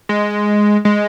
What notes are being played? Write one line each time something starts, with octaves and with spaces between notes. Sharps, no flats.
G#3
G#3